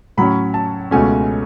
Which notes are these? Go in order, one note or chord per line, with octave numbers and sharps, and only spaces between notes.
A2 F#3 C#4 B5
A5
C#2 B2 A3 C#4 G#5